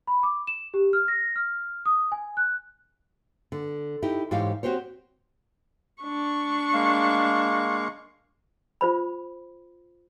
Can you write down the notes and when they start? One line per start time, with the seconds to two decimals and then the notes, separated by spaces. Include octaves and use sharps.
0.07 B5
0.23 D6
0.47 E7
0.74 G4
0.93 F6
1.08 A#6
1.36 F6
1.86 D#6
2.12 G#5
2.37 F#6
3.52 D3
4.02 D#4 E4 G4
4.31 G#2 E3 G4 C5 C#5 F5
4.63 C4 F#4 G4 C5 C#5
6.03 D4 C#6
6.73 G#3 A#3 F5
8.81 F4 C5 B5